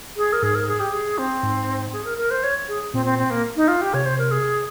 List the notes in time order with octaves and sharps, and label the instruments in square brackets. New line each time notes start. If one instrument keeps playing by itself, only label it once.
[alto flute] G#4
A#4
[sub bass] G#2 [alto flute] G#4
[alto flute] A#4
G#4
G4
G#4
C4
[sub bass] G#2
[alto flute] G#4
A#4
A#4
C5
C#5
G#4
[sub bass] A#2 [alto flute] C4
[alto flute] C4
C4
A#3
D#4
F4
G4
[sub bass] C3 [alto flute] C#5
[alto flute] C5
A#4
G#4